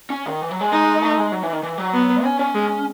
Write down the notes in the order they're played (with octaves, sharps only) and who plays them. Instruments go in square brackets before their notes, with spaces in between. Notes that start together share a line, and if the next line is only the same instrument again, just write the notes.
[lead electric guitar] C#4
D#3
E3
F#3
G#3
[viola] D#4
[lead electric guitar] A3
G#3
F#3
E3
D#3
E3
F#3
[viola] B3
[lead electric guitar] C#4
C#4
[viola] G#3